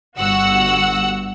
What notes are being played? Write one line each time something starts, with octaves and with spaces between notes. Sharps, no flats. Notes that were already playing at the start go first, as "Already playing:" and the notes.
G1 G2 F#4 F#5 E6